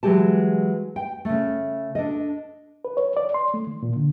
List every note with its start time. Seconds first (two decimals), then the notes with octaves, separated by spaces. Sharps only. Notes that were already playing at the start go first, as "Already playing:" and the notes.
0.03 E3 F#3 G#3 G4 A5
0.96 G5
1.25 C#3 A3
1.95 D4 A4 D#5
2.85 B4
2.97 C#5
3.17 D5
3.34 C6
3.54 A3
3.67 D#3
3.83 A#2
3.96 D3